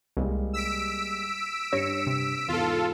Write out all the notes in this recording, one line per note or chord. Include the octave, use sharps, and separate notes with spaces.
C2 G3 G#3 A#3
E6 B6 D7
G2 G4 C#5 A#6 C#7
C3
E2 G#2 F4 A4